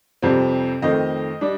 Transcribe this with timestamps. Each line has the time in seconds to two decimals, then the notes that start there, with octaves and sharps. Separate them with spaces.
0.22 F2 C3 G3 C4
0.82 F2 D#3 A3 C4 D#5
1.41 G3 D4